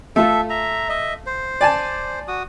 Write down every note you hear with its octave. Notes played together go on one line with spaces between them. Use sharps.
A3 F4 A4 E5
E5 A#5
D#5 E5
C5
D5 G#5 A5
F#4 D#6